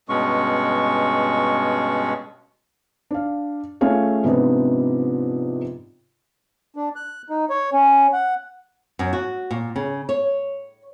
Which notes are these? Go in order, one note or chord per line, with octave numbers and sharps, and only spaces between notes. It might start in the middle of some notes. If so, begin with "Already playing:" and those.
G2 B2 G#3 C#4 C#6
D4 F5
A3 C#4 F4 G#4 C#5 F5
G#2 C3 F3 B3 D4 D#4
D4
F#6
D#4
C#5
C#4
F#5
F#2
F#4
A#2
C#3
C#5